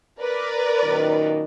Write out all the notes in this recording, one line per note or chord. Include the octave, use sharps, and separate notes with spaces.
A#4 B4 D5
F#2 A#2 D#3